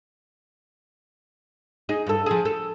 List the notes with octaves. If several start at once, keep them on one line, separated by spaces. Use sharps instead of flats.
D#4 G#4
G2 A4
F3 G#4
A4